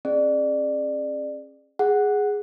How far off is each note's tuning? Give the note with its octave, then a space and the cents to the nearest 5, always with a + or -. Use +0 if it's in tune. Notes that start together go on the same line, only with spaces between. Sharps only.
C#4 -40 G#4 +0 D5 +25
G#4 +0 F#5 +0